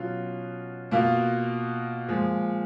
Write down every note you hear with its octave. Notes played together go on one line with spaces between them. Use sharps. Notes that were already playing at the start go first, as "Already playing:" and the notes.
Already playing: B2 F#3 C#4 F4
B2 A#3 F4
A#2 F3 G#3